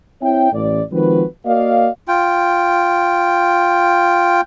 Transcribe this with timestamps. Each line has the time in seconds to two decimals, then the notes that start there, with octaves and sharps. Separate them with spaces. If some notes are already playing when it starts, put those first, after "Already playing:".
0.22 C4 E4 C#5 E5 G5
0.53 A1 D5
0.92 D#3 F3 G#3 C4 F#4 B4
1.45 A#3 F#4 A#4 D5 D#5 F5
2.08 F4 G5